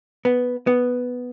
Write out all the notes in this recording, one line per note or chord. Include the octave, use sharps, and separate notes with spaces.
B3
B3